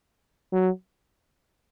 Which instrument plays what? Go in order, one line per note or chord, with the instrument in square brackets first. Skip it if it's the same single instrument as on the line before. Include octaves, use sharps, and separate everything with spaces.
[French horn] F#3